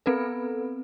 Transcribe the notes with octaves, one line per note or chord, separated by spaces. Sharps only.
B3 C4 A4 B4